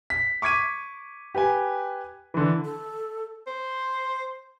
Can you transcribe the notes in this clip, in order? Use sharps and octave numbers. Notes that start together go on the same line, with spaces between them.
B6
C#6 D6 G#6 B6 D#7
G4 B4 G5 G#5
D3 E3
A4
C5